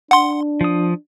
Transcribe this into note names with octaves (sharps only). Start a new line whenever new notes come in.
D4 F#5 C6
F3 D#6